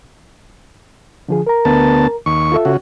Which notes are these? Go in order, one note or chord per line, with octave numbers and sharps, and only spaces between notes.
D3 F3 G#4
A#4 A#5
D2 B3 A5
D#2 C#6
F4 A4 E5
C#3 F#4